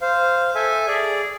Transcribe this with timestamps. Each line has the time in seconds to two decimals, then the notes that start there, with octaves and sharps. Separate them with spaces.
0.01 C5 F5
0.55 A4 E5 G#5
0.88 G#4 D5